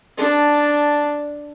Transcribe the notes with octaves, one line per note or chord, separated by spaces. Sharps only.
D4 A5